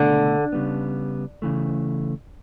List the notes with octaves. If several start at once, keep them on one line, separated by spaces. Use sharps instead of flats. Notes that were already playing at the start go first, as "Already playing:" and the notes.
Already playing: C#2 B2 D3 A3
C#3 G3 B3
C#3 E3 A3